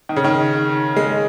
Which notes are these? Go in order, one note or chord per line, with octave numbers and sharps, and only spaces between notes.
D#3
C#3
D#3
G#3